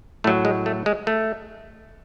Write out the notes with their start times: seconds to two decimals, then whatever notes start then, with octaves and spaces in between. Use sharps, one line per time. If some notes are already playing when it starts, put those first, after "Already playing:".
0.24 A2 F#3 A3
0.45 G#3
0.66 A3
0.86 G#3
1.07 A3